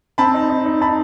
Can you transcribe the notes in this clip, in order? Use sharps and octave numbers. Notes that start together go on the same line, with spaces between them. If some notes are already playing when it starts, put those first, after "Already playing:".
C4 A5 B5
D#4
D#4
D#4
D#4 A5 B5